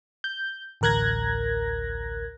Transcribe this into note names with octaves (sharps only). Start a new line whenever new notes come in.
G6
A1 D2 A#4 F#6 G#6 A#6